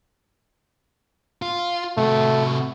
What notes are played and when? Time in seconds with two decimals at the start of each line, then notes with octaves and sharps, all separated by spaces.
1.42 F4
1.98 C3 A3 F#4